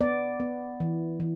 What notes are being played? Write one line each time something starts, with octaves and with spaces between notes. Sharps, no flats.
B3 D5
B3
E3
E3